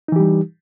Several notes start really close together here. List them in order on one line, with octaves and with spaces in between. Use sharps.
D#4 E3 G4 G3